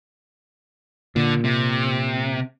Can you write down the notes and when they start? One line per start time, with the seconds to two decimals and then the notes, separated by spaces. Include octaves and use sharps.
1.16 A#2 D3
1.45 C3